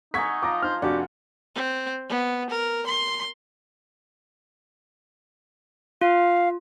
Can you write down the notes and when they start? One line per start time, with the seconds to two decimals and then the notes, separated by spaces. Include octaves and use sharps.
0.14 D#4 E5 F#5 G#5 A#5 C#6 G#6 B6
0.43 F3 F4 A#5 D6
0.62 D#4 C5 F6
0.82 F1 D4 F#4 G4 F#5
1.55 C4
2.09 B3
2.50 A#4
2.87 C6
6.01 F4 F5